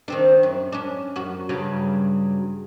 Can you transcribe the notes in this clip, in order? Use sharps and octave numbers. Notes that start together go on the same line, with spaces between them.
D#3 C4 D4
F#2
C#4 D4
F#2 F#4
G2 C#3 F#3